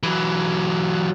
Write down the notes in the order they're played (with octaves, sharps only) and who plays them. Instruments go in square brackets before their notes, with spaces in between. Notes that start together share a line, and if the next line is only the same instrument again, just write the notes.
[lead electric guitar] E3 F#3